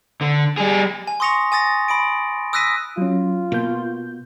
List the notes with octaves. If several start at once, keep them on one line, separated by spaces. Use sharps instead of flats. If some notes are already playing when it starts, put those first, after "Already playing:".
D3
G3 G#4
G#5
C6 C#6 D#6 A#6 C#7 F7
G#5 D#6 A6 A#6
B5 D#6 D7
D#6 E6 F#6 A#6 B6 D#7
F#3 C#4 F4
B2 A#3 G6